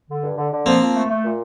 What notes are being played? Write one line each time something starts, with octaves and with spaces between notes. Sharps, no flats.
D3
G2
D3
D3
F3 A#3 C4
F3
A3
A3
A#2